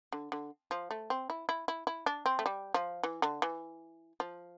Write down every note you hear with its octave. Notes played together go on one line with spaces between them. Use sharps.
D3
D3
F3
A3
C4
E4
E4
E4
E4
D4
C4
A3
G3
F3
E3
D3
E3
F3